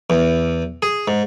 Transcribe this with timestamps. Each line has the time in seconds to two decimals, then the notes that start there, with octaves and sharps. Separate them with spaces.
0.10 E2
0.82 G#4
1.08 G#2